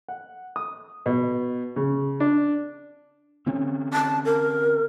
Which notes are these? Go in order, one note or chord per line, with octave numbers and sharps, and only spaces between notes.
F#5
D#6
B2
C#3
D4
D3 C4 C#4
A5
A#4